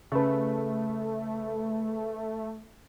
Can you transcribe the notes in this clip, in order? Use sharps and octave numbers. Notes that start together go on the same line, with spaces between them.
C#3 A3 B4